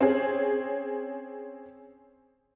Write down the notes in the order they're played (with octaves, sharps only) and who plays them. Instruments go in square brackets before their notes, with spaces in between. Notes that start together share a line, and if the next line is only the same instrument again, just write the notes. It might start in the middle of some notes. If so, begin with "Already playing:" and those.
[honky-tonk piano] C4 C#4 G#4